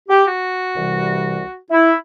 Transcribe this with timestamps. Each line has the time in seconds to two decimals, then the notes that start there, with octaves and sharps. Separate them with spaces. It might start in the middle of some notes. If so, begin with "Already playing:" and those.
0.09 G4
0.25 F#4
0.73 C2 C3 E3 G3
1.70 E4